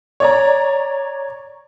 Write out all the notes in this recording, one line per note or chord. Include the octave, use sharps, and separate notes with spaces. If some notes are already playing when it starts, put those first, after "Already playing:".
C#5 D5 A#5